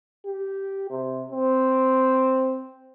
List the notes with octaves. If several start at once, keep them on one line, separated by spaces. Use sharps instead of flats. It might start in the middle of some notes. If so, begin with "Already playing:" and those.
G4
C3
C4